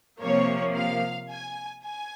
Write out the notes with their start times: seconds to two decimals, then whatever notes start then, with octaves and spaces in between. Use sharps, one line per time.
0.21 C3 F3 A#3 C#5
0.76 F5
1.31 G#5
1.86 G#5